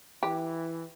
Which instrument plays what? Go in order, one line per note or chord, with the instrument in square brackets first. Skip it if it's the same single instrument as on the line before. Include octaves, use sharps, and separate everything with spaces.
[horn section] E3 [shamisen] G4